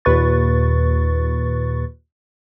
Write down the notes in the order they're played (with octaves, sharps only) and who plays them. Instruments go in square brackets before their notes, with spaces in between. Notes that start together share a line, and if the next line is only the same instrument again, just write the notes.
[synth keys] D#2 A#2 B4 C#6 A6